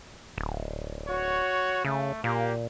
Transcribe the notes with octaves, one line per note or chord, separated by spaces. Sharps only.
D1
F#4 C#5
C#3 A3
A#2 A#3 G4